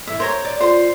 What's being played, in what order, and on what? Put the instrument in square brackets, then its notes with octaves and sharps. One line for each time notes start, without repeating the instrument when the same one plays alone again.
[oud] G2 E3 [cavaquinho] E5
[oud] A#4 [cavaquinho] C5 C#5 A#5
[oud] D5
[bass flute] F4 [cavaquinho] C5 C6